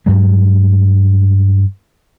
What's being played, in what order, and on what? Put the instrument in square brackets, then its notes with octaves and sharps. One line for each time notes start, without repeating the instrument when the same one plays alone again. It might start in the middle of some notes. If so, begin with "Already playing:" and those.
[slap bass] G2 F#3 G#3